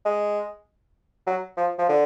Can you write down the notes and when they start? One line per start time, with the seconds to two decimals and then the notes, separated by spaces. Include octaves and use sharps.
0.05 G#3
1.27 F#3
1.57 F3
1.79 F3
1.89 D3